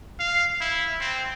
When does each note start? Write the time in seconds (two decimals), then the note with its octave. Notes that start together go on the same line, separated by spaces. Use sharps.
0.19 F5
0.61 E4
1.00 C4